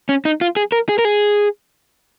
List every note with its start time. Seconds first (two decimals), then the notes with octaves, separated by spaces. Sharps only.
0.09 C#4
0.25 D#4
0.41 F4
0.56 G#4
0.72 A#4
0.89 G#4
0.99 A#4
1.05 G#4